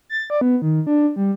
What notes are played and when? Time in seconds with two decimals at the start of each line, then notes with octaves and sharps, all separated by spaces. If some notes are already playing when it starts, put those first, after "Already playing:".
0.09 A6
0.30 D5
0.41 B3
0.62 D#3
0.87 D4
1.16 G3